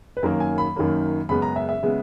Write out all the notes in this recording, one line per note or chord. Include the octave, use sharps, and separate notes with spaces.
B4
F#2 D#3 F#3 A#3 A#4
G#5
B5
F#2 D#3 F#3 A#3
F#2 C#3 G#3 B3 B5
A#5
E5
E5
C#3 G#3 B3